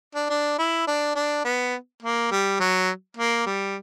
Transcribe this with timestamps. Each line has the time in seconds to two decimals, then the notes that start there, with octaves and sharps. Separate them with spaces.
0.15 D4
0.30 D4
0.58 E4
0.87 D4
1.15 D4
1.45 B3
2.02 A#3
2.31 G3
2.60 F#3
3.17 A#3
3.46 G3